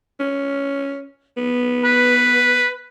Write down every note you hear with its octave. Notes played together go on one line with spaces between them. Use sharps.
C#4
B3
B4